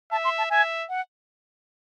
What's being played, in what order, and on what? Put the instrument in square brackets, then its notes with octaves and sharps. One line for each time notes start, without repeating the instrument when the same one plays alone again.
[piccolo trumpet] E5 [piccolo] A5
[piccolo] C6
A5
[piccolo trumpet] E5 [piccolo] G#5
[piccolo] F#5